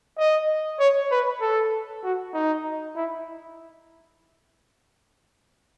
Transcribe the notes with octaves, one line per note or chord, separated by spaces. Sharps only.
D#5
C#5
B4
A4
F#4
D#4
E4